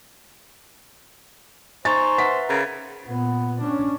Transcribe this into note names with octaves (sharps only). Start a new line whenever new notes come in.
D#4 C5 G#5 C#6 A6
B4 E5 F#5 B6
C#3 A#4 B5 G#6 A6
A#2 B3
C#4 D4